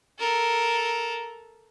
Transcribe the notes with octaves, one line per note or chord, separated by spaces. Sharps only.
A4 A#4